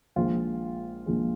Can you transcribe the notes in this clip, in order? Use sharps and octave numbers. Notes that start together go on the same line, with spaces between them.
A#1 A#2 F3 G#3 F4
A#1 A#2 F3 G#3